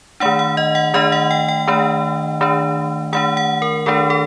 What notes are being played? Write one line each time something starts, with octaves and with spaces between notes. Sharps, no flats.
D#3 A3 D4 F#5
F#5
D#5
F#5
D#3 A3 D4 D#5
F#5
G5
G5
D#3 A3 D4
D#3 A3 D4
D#3 A3 D4 F#5
F#5
A#4
D#3 A3 D4 A4
A4